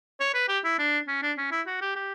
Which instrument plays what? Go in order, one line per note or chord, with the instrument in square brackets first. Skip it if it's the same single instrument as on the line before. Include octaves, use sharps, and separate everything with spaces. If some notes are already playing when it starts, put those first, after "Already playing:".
[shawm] C#5
B4
G4
E4
D4
C#4
D4
C#4
E4
F#4
G4
G4